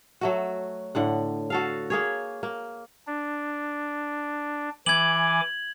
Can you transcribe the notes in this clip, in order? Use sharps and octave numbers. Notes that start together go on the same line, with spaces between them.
F#3 A3 F#4
A2 D3 F#5
F#4 A4 F5
A#3 G#4 C#5
A#3
D4
E3 G#5 D6 G#6 F#7